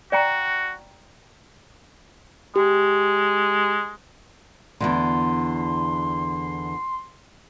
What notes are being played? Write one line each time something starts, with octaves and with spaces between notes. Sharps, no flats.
F#4 D5 G5 A#5
G#3 G4
E2 G#2 D3 C6